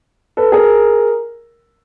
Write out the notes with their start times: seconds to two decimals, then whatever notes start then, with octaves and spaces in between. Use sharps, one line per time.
0.37 A4 B4
0.52 G#4 A#4